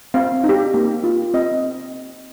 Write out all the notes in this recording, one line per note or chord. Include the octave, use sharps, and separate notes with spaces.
C4 F5
D#4
G4
A#3
F4
C4 D#5